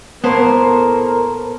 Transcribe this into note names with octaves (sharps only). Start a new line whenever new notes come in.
A2 A#3 B3 A#4 C5